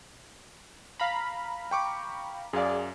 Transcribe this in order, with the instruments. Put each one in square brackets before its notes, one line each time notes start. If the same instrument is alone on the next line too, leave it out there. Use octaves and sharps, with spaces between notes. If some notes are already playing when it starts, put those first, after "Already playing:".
[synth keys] F5 A#5 B5
[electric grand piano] G5 C#6 D6
[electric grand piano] F#2 F5 [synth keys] G#4 D5